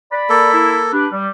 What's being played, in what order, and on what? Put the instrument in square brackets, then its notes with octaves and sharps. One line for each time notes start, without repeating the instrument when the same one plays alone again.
[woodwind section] D5 B5
[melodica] A#3 A4
[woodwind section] E4
D4 G4 B4
G3